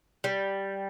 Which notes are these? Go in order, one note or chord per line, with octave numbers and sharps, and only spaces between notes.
G3